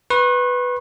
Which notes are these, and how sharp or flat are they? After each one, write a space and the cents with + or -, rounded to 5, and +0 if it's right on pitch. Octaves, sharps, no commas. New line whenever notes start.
B4 +0 C#6 -45